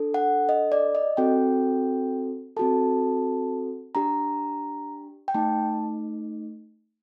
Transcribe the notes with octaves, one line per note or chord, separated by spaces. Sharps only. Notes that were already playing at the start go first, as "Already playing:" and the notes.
Already playing: D4 A4
F#5
D#5
D5
D#5
C4 F#4 A4 G5
C4 F#4 A4 A5
D4 G4 A#5
G5
A3 D#4 A5